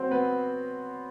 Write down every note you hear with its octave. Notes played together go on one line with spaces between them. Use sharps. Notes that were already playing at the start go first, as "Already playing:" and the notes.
Already playing: F#3 C4 F#4 C5
B3 B4